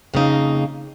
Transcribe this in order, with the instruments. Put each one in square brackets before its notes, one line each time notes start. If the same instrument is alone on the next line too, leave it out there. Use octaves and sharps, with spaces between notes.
[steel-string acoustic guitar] F2 C#3 A#3 D#4